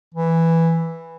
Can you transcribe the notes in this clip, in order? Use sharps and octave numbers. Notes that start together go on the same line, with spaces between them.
E3